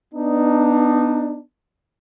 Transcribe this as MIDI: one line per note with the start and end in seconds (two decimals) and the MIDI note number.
0.14 1.40 59
0.14 1.40 62
0.14 1.40 63